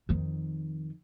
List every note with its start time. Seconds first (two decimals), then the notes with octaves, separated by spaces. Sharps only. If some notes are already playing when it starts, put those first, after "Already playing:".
0.09 F2 D#3